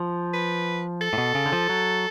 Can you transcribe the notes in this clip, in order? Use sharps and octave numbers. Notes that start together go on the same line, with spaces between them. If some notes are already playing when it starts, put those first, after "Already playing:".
Already playing: F3
B4
A4
A2
B2
C#3
D3
F3
F#3